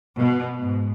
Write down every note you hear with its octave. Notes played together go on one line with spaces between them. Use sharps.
B2
G#2